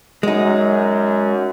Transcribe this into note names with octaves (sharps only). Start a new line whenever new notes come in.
F#2 G#3 D#4